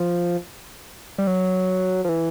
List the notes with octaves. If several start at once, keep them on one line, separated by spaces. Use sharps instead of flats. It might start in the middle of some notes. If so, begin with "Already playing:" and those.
Already playing: F3
G3
F#3
F3
E3